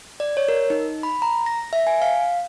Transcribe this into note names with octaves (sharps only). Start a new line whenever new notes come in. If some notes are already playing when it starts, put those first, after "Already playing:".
D5
C#5
A#4
D#4
B5
A#5
A#6
E5
G#5
F5